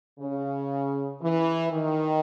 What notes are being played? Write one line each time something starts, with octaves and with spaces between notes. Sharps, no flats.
C#3
E3
D#3